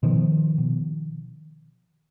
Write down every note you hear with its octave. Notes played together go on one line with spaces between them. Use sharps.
B2 D#3 F3
B2